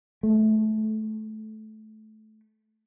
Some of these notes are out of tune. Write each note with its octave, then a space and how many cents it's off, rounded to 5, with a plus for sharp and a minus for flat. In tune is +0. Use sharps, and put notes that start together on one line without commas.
A3 -20